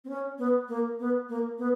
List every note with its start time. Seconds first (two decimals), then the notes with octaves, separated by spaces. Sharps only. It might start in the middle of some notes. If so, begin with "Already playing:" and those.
0.04 C4
0.09 C#4
0.38 B3
0.68 A#3
0.99 B3
1.29 A#3
1.58 B3